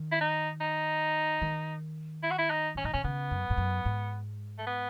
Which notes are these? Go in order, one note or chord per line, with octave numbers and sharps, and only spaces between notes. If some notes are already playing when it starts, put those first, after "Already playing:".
Already playing: D#3
E4
D#4
D#4
D#3
E4
F#4
E4
D#4
G#2 C#4
A2 D#4
B2 C#4
C#3 B3
F#2
G#2
F#2
G#2
A3
B3